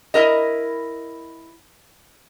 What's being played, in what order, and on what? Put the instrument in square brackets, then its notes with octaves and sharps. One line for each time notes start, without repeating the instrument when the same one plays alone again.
[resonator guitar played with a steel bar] E4 A#4 D#5